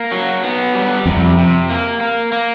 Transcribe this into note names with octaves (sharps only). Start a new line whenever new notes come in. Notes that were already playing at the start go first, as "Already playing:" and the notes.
Already playing: A#3
F#3
B3
G3
F2 C3
C3
A#3
A#3
A#3